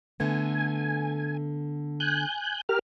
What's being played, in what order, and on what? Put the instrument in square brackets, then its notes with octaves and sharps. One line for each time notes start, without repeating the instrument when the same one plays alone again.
[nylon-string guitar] D3 A3 B3 [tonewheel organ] G#5
[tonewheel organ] G#5 F#6 G6
G4 A#4 F6